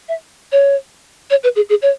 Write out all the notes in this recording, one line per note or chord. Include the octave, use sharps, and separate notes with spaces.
E5
C#5
C#5
B4
G#4
G#4
C#5